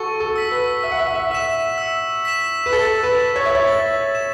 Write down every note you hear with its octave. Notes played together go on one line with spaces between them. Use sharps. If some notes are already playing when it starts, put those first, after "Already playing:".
Already playing: F#4 A4 C#6
A4
E6 B6
B4
E5 E6
F#5
E5
F#5
E5
E5 B6 E7
E6
B6 E7
B4
A4 A6
B4
E7
C#5
E5
C#5
A6
E7